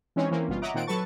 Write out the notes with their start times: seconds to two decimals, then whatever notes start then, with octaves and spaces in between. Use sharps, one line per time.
0.16 E3 G#3 C4 C#4 D#4 C#5
0.31 E3 A#3 C4 C#4
0.48 G1 B2 G3 F4
0.62 C#5 D#5 E5 F#5 A#5 D6
0.74 A#2 D#3 C4 F4 F#5 D7
0.87 F#3 A4 B4 A5 C#6 A6